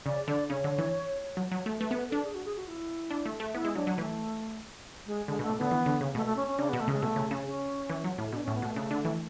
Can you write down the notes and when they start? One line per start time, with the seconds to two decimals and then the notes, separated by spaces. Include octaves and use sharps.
0.06 C#3 D5
0.28 D3 D5
0.50 C#3 C#5
0.64 D3
0.78 E3
1.37 F#3
1.52 F#3
1.66 A3
1.80 A3 B4
1.91 B3 B4
2.09 D4 A4
2.24 G#4
2.35 F#4
2.45 G#4
2.57 F#4
2.67 E4
3.11 D4
3.26 A3
3.40 A3
3.54 B3 E4
3.65 G#3
3.75 F#3 D4
3.87 F#3
3.97 E3 A3
5.07 G#3
5.28 D3 G#3
5.39 B2 A3
5.50 A2
5.58 D3 B3
5.71 E3
5.86 D3
6.01 C#3
6.15 B2 A3
6.26 A3
6.36 C#4
6.48 C#4
6.58 C#3 D4
6.69 B3
6.73 B2
6.80 A3
6.88 C#3 G#3
7.02 B2 A3
7.16 C#3
7.31 C#3
7.46 C#4
7.89 E3
8.04 F#3
8.18 A2
8.32 B2 D4
8.44 C#4
8.48 A2
8.55 B3
8.62 B2 A3
8.76 C#3
8.91 D3
9.05 E3